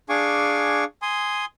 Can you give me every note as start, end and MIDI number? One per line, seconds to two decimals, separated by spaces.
0.09 0.84 62
0.09 0.84 68
0.09 0.84 77
0.09 0.84 80
0.09 0.84 85
0.09 0.84 86
1.02 1.45 80
1.02 1.45 84
1.02 1.45 87